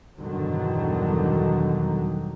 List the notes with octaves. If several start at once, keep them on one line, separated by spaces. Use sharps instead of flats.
E2 G2 B2 D3 D#3 F#3